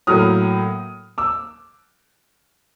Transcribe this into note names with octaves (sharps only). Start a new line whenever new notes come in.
A2 F#3 A#3 D#6 F6
D6 E6